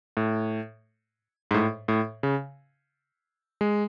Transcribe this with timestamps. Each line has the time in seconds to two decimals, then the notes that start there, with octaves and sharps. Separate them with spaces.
0.17 A2
1.51 G#2
1.54 A2
1.88 A2
2.23 C#3
3.61 G#3